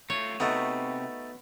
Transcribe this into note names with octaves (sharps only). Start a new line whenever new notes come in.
A3 F4 C#5
C3 A3 B3 D#4 F#4